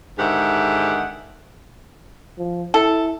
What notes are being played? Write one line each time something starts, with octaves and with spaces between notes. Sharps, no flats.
G#2 D3 D#3 G4 E5 F#5
F3
E4 A4